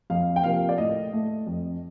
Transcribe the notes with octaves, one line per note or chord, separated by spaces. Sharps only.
F2 F5
G5
C3 F3 A#3 F5
D5
A2 D#5
A3
F2